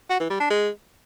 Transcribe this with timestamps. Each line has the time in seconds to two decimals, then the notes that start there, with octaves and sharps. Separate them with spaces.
0.10 F#4
0.20 E3
0.30 G3
0.40 D4
0.50 G#3